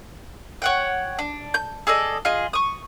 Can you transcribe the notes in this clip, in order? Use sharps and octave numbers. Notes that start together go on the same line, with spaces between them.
C#5 F#5 G5
D4
G6
G#4 A4 D5 D#5
F4 G#4 D#5
C#6 D#6